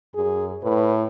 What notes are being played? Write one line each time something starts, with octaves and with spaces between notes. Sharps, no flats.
F#2 G#4
A2 B4